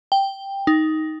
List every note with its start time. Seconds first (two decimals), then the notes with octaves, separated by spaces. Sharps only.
0.12 G5
0.67 D#4